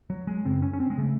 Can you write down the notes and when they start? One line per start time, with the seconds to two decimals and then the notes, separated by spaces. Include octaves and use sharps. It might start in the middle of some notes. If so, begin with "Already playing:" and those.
0.10 F#3
0.27 G#3
0.45 F#2 C#3 C4
0.62 C#4
0.73 C#4
0.80 C4
0.90 G#3
0.98 C#3 A3